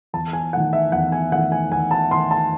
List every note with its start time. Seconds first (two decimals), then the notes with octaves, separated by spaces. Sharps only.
0.13 E2 A5
0.33 G#5
0.53 D#3 A3 F#5
0.73 E5
0.92 E2 F#5
1.12 G#5
1.32 D#3 F#5
1.35 A3
1.52 G#5
1.71 E2 G#5
1.91 A5
2.11 D#3 C6
2.15 A3
2.31 A5